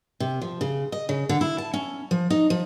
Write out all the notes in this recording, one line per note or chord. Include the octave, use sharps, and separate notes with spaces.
C3
F3
C#3
D#5
C#3
D3
E4
A5
C#4
F3
D#4
F3